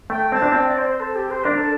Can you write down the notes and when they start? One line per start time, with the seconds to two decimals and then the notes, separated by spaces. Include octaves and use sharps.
0.10 A3 G5
0.32 C4 A5
0.42 D4
0.52 C4 G5
0.67 D5
0.78 C5
0.90 C5
1.00 A4
1.16 G4
1.31 C5
1.44 D4 A#4
1.57 A4